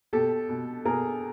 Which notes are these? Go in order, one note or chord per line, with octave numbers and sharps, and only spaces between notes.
B2 G4 A4
B2
B2 G#4 A#4